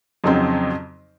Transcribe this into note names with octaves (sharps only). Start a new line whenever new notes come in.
F2 C#3 F#3 C4 D#4